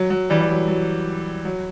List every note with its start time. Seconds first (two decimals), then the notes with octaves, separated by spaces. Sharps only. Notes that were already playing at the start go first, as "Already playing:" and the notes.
Already playing: F#3
0.10 F#3
0.30 E3 G3
0.41 G3
0.49 F#3
0.68 F#3
1.45 F#3